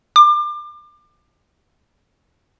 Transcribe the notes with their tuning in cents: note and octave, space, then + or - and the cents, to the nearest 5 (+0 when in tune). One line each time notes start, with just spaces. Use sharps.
D6 +30